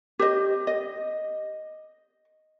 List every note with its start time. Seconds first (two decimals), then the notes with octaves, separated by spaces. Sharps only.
0.19 G4 C5 D#5
0.67 D#5